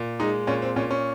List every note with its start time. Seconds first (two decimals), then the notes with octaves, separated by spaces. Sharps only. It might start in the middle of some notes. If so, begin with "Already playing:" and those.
Already playing: A#2
0.20 G#3 D#4
0.47 A#2 C#4
0.62 C4
0.76 A#2 C#4
0.91 C#4